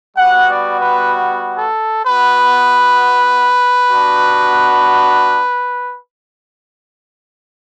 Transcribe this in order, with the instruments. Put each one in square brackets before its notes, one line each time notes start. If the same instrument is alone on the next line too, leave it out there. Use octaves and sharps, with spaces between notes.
[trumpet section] G3 B3 F#4 F#5
D5
B4
A4
B3 F#4 B4
B3 D4 F#4